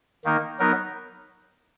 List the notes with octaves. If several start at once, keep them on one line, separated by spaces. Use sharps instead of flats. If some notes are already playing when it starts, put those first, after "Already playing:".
D#3 A#3 D#4 A#4
F#3 B3 D#4 A#4